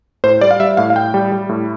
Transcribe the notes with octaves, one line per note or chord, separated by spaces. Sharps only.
A2 C5
G3 D5
F5
G3 E5
A2 F5
F5
A2 G5
G3
G3
A2